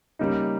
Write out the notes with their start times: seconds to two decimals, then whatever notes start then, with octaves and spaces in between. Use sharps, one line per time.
0.19 C#3 G3 A#3 D#4